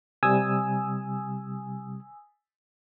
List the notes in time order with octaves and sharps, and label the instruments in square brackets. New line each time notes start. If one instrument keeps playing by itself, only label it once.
[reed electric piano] C3 G3 [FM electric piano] G#5 D#6 E6